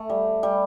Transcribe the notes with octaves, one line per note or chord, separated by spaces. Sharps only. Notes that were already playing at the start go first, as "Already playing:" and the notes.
Already playing: A3
G3
G3